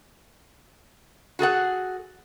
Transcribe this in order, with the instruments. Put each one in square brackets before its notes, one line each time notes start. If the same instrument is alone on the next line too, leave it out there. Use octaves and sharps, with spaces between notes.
[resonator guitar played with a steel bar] F#4 G#4 A4 F#5